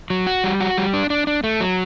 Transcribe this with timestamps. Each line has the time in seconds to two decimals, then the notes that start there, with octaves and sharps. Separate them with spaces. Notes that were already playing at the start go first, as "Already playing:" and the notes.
0.10 F#3
0.27 F#4
0.44 G3
0.60 F#4
0.78 G3
0.94 D4
1.10 D4
1.27 D4
1.44 A3
1.60 F#3